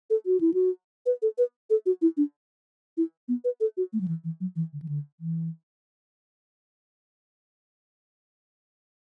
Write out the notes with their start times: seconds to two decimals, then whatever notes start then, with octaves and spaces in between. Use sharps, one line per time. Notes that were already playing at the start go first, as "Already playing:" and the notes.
0.10 A4
0.26 F#4
0.41 E4
0.54 F#4
1.06 B4
1.22 A4
1.38 B4
1.70 A4
1.86 F#4
2.02 E4
2.17 D4
2.97 E4
3.28 B3
3.44 B4
3.61 A4
3.77 F#4
3.93 A3
4.01 F#3
4.08 E3
4.24 E3
4.40 F#3
4.56 E3
4.73 D3
4.82 E3
4.88 D3
5.20 E3